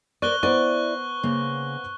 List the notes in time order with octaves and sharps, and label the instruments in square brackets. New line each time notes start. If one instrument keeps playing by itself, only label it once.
[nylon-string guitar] A#4 C5 D5 [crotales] C#6 F#6 G7
[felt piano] B3 B4 C5 [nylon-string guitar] E4 D5 [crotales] C#6
[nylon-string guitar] C#3 A#3